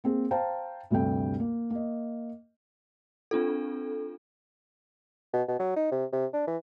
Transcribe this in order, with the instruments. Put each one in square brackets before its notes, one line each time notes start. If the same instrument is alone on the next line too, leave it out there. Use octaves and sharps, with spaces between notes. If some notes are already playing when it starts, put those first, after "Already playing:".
[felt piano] A#3 C4 G#4
C5 F5 G5 A5 A#5
D2 G2 C3 A3 G5
A#3
A#3 D#5
[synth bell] C4 D4 F4 A4
[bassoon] B2
B2
F#3
D#4
C3
C3
D4
E3